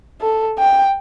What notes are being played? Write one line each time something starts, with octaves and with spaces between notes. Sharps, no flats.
A4
G5